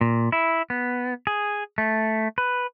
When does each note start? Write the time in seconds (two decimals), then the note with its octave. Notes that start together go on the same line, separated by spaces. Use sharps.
0.01 A#2
0.32 E4
0.70 B3
1.27 G#4
1.78 A3
2.38 B4